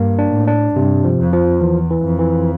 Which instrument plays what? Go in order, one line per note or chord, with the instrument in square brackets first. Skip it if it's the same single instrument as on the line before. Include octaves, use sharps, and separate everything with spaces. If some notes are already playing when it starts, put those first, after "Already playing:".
Already playing: [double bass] G2 [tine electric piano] A#3
[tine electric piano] D4
[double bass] A2
[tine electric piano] D4
[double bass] G2 [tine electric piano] C3
[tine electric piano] F3
[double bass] F2
[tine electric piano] F3
[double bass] E2 [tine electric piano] E3
[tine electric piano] E3
[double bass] F2
[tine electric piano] E3